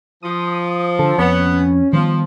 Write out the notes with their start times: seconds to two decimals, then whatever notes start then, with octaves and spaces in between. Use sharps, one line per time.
0.23 F3 D#6
0.99 D3 A4
1.18 F2 B3 C#4
1.93 D#3 F3 G3 B3